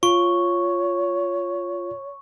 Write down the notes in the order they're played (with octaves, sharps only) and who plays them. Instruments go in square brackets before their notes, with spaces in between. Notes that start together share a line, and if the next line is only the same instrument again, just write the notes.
[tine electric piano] F4 [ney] C#5 [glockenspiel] C#6